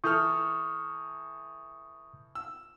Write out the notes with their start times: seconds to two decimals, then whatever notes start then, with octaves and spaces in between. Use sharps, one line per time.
0.04 E3 A4 C#6 D#6 F6 G6
2.35 E6